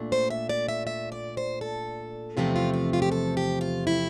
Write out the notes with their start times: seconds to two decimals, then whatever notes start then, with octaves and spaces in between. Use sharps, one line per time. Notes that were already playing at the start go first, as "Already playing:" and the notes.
Already playing: A#2 A3 D4
0.12 C5
0.30 E5
0.49 D5
0.68 E5
0.87 E5
1.12 D5
1.37 C5
1.61 A4
2.37 E2 C3 F3 A3 C4 F4
2.56 F4
2.74 F4
2.93 F4
3.02 G4
3.12 A4
3.37 G4
3.61 F4
3.87 E4